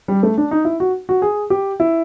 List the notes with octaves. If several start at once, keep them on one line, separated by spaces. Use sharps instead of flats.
G3
A3
D4
D#4
E4
F#4
F#4
G#4
G4
E4